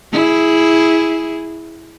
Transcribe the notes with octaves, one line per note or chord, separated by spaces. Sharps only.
E4 G#4